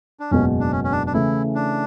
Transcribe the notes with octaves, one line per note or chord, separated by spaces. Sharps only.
D4
F#1 E2 B2 G#3 C#4
D4
C#4
C#4
D4
D4
C#3 E3 A3 E4
D4